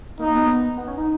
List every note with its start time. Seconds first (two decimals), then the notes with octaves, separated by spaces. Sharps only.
0.19 A#3 D#4
0.35 B3
0.77 B3
0.88 C#4
0.98 D#4